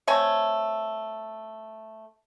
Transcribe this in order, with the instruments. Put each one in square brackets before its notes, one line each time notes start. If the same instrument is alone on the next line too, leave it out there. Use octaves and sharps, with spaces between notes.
[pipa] A3 C4 C#5 G#5